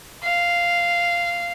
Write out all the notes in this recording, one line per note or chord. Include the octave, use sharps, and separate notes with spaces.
F5